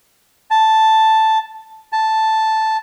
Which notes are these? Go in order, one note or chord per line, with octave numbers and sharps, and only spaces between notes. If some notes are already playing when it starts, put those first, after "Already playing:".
A5
A5